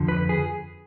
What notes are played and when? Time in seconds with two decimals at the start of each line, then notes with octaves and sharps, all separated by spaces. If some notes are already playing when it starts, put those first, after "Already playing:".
Already playing: F2 D3 F3
0.08 B4
0.29 G#4